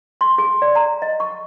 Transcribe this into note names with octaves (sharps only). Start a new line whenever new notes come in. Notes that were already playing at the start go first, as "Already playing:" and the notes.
C6
G#4
D5
A#5
D#5
C#6